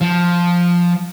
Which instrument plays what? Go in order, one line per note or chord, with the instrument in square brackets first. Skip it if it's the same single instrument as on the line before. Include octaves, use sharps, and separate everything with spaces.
[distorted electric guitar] F3